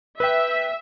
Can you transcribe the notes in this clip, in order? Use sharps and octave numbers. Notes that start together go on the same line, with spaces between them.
B4 E5 G5